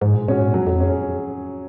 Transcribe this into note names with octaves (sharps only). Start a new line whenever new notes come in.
G#2 G#3
A#2
A#2 C#4 F#4
G#2
F#2 F#3
F2
C#4 G#4